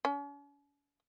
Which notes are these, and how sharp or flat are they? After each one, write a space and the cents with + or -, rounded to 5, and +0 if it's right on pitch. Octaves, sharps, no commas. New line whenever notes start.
C#4 +45